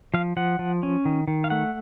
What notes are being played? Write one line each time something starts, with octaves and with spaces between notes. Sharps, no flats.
F3 F5
F3 F#5
F3
C#4
D#3
D#3
F5
A3 F#5